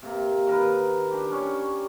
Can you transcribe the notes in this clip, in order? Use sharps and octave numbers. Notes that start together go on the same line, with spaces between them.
C3 A#3
D#3 A#4 B4
D4 G4
C#4 C#5